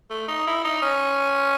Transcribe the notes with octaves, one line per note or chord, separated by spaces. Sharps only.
A3
D#4
E4
D#4
C#4